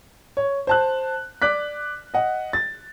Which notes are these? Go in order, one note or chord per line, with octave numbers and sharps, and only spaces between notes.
C#5
C5 A5 F#6
D5 D6 F#6 B6
D#5 F#5
A6